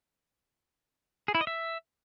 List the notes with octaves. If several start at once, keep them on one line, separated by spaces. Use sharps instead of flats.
G#4
E4
D#5
E5